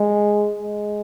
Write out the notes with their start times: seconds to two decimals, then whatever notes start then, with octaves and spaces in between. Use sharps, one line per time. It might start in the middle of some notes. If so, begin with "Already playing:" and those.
Already playing: G#3
0.59 G#3